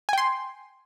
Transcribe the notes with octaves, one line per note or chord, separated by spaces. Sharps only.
G5 G#5 C6